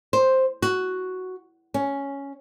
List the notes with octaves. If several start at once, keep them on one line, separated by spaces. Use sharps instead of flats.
C5
F#4
C#4